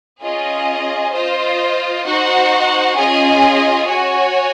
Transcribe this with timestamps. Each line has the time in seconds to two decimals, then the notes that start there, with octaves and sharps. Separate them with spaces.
0.22 C#4 F4 G#4 D#5
1.13 F4 C5 D#5
2.04 D#4 F#4 C5 F#5
2.96 C#4 F4 G#4 D#5 G#5
3.87 F#4 C#5 G#5